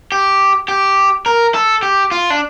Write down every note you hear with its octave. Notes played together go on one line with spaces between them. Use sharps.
G4
G4
A#4
A4
G4
F4
D4